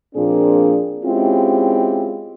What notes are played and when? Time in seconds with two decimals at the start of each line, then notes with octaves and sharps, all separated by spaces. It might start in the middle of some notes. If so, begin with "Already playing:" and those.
0.15 A#2 F3 A#3 C4 D4 G#4
1.04 G#3 C4 C#4 E4 F4 G4